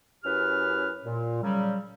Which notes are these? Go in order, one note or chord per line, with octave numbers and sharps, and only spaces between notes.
F#2 C#4 E4 G4 B4 F6
A#2
C#3 F#3 G3